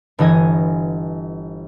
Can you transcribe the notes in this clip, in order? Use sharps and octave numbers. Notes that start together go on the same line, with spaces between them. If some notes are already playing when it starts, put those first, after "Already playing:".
G1 E3 D#5 G#5 G#6